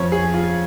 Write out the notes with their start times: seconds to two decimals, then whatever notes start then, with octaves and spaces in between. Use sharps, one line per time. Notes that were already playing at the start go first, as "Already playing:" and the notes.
Already playing: F2 F3 C#5
0.12 G#4
0.34 F4